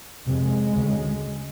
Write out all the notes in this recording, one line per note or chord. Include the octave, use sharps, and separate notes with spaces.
F2 C3 G#3
D2 C#3